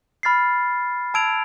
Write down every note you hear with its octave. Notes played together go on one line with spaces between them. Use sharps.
B5 F6 A6 C7
A5 E6 G#6 D7 F7